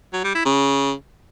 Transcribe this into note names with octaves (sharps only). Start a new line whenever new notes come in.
F#3
G3
E4
C#3